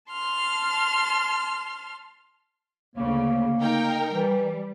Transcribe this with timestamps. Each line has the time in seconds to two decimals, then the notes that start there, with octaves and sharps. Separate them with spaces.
0.11 A5 C6 F6
2.95 D2 C#3 A#3
3.60 D#4 A#4 G5
4.13 E3 G3